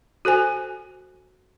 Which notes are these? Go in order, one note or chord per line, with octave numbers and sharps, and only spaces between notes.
F#4 A4 C5 G#5